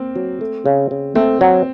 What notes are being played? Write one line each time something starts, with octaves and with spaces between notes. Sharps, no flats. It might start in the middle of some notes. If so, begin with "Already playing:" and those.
Already playing: A#3 C4
F#3
A3
C#3
C#3
A3 C4
F#3